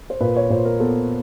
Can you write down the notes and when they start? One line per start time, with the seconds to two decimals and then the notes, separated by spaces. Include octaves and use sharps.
0.10 C5
0.21 A#2 B4
0.37 C#5
0.50 A#2 C5
0.65 A#4
0.80 B3 A4